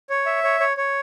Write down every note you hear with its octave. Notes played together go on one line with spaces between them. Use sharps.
C#5
E5
C#5
C#5
C#5